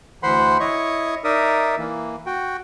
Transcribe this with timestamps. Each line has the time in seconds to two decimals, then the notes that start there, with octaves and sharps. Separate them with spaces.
0.23 D2 E3 C5 F#5 B5 C6
0.60 E4 C#5 D#5 C#6
1.24 D#4 A#4 D5 E5 D#6
1.78 E3 A#3
2.26 F#4 G5